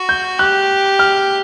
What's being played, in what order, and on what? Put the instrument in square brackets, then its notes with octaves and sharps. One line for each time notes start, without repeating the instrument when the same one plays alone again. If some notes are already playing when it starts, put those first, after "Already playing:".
Already playing: [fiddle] F#4
[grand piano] G6
[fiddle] G4 [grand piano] F#6
[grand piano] F6